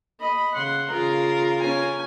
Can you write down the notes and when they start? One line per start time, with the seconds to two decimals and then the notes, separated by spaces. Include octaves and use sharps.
0.21 D#5 B5
0.54 C#3 F#5 C6
0.91 C#3 F4 G#4 A#4
1.61 C#4 G#5